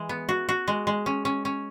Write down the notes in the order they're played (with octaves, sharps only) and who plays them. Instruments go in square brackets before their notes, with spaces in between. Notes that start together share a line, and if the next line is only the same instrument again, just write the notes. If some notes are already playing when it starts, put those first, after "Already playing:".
Already playing: [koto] E3 G#3
B3
F#4
F#4
G#3
G#3
C#4
C#4
C#4